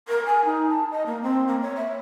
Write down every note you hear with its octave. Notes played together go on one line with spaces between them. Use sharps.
A#4
G#5
D#4
A5
D#5
A#3
C4
A#3
C#5
E5